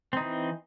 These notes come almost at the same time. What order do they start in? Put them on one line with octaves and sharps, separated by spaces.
C4 D#4 E3